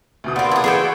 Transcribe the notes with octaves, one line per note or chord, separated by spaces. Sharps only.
D2 B2 D#6
A#2 G3 B3 C4 F4 F#5
E4 G#4 A5 D6
E3 A3 G#4 A4 G5 B5
F#4 D5